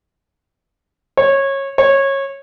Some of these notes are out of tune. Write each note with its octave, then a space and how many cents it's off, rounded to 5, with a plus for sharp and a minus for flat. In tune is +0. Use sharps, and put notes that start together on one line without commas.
C#5 -20
C#5 -20